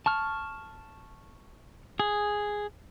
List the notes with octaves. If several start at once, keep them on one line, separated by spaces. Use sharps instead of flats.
A5 C#6 F6
G#4